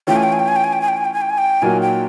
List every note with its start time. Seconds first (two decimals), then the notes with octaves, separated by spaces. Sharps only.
0.07 E3 A3 C#4 F4 G5
0.16 G#5
0.23 G5
0.32 G#5
0.40 G5
0.48 G#5
0.56 G5
0.64 G#5
0.73 G5
0.81 G#5
0.89 G5
0.97 G#5
1.05 G5
1.13 G#5
1.21 G5
1.30 G#5
1.38 G5
1.62 A#2 F#3 A#3 D#4 F#4 G#5
1.81 G5